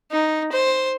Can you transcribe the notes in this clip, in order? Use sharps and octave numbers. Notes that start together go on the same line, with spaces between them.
D#4
C5